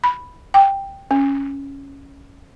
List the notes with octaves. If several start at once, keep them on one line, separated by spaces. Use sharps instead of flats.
B5
G5
C#4